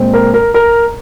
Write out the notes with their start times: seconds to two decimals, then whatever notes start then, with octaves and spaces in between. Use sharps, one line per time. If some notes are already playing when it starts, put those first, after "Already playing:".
Already playing: A#2 G#3 C4
0.14 A#4
0.34 A#4
0.54 A#4